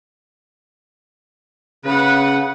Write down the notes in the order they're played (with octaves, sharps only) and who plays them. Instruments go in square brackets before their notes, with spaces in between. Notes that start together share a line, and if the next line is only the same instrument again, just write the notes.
[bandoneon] C#3 [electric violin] B4 F#5